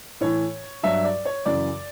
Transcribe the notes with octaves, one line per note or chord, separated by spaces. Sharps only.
A2 E3 C#5
G2 F#3 E5
D5
C#5
F#2 C#3 E3 D5